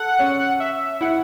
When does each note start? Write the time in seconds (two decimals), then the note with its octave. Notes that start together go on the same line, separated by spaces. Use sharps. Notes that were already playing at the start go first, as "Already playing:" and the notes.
Already playing: A4 F#5
0.19 C#4
0.60 E5
1.01 E4 F#5